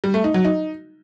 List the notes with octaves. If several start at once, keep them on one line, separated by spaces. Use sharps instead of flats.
G3
A3
D#4
F#3
D#4